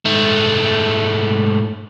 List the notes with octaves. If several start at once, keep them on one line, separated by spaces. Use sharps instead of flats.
G#2 A3